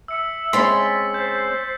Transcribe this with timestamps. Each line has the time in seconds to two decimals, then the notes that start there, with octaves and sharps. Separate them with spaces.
0.08 E5 E6 C#7
0.53 G#3 C4 C#4 B5 C6 A6 B6
1.14 C5 G6